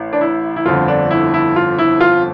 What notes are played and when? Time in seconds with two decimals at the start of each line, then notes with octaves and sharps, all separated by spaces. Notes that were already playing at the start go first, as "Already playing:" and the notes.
Already playing: A1
0.13 D4
0.21 E4
0.56 E4
0.66 G1 F2 D3 F4
0.88 D4
1.11 E4
1.34 E4
1.56 F4
1.79 E4
2.01 F4